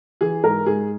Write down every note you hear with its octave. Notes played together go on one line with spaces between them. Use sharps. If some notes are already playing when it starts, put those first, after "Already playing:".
E3 G#4
G#2 A#4
G#2 G#4